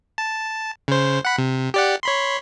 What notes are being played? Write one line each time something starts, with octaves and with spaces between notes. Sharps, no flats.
A5
C#3 C5
F#5 B5
C3
G4 D5 F#5
C#5 B5 C6